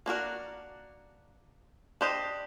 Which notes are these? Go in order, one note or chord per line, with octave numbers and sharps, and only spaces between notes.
A#3 D4 F#4 A#4
D4 G4 C5 D#5